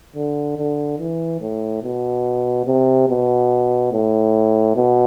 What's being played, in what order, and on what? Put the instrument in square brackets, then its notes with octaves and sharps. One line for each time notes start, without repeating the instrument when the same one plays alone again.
[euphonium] D3
D3
E3
A2
B2
C3
B2
A2
B2